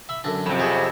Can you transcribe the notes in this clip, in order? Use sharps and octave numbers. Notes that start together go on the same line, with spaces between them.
E5 B5
F#2 D3 D4
F2 C3
G#4 C#5